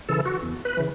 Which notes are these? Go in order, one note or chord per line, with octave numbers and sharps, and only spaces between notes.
C#3 E3 A4
F#4
E2
B4
C#3 E3